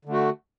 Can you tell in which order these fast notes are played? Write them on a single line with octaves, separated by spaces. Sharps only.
D3 A3 F#4